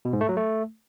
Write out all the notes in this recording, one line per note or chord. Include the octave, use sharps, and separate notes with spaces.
B2
G#2
A3
F#3
A3